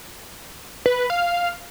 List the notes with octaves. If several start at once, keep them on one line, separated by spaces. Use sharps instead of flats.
B4
F5